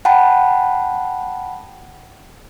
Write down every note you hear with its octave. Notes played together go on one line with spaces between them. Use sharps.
F#5 G5 A5 B5